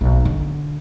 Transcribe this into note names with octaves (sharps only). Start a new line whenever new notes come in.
B1
D3